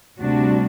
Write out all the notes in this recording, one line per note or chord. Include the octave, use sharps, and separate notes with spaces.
D2 C3 G3 D4 F#4